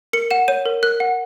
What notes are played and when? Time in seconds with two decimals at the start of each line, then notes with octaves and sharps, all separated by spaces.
0.13 A#4 C#7
0.31 F#5 E7
0.48 C#5 D#7
0.66 A#4
0.83 A#4 F#6
1.00 F#5